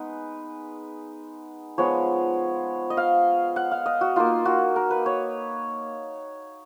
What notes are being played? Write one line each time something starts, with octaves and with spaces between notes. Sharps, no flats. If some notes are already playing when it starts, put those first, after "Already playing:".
Already playing: G#3 B3 D#4 B4
F3 G#3 B3 F4 C#5
D#5
F5
F#5
F5
D#5
F#4
A#3 D#4 F4
F#4
A#4
B4
C#5